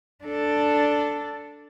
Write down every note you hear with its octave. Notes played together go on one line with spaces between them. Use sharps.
D4 A4